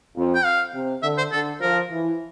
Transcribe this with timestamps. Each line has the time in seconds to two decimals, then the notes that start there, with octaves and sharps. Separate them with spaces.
0.16 F2
0.34 G5
0.45 F5
0.74 C3
1.02 D3 E5
1.18 C5
1.31 D3 A4
1.60 F3 A#4
1.90 E3